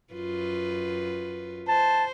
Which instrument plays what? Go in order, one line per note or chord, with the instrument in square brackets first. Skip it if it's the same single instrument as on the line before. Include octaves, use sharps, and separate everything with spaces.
[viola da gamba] F#2 F4 B4
[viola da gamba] C5 [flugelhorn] A5